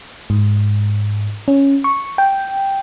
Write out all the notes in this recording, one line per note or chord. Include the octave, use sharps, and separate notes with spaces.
G#2
C#4
C#6
G5